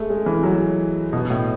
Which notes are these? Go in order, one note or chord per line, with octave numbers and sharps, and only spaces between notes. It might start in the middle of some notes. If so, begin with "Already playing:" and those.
Already playing: G#3 A3
G#3
E3
F#3
B2
A2